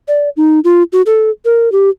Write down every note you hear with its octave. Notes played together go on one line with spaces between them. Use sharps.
D5
D#4
F4
F#4
A4
A#4
G4